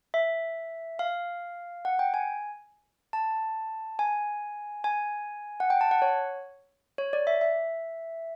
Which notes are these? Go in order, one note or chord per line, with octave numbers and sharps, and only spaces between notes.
E5
F5
F#5
G5
G#5
A5
G#5
G#5
F#5
G5
A5
F#5
C#5
C#5
D5
E5
E5